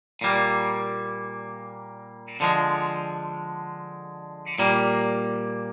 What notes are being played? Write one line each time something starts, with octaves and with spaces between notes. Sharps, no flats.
A#2 G3 A#3
D3 F3 G#3
A#2 G3 A#3